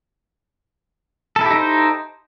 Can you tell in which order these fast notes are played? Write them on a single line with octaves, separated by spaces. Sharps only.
A4 E4 G4 D#4 C5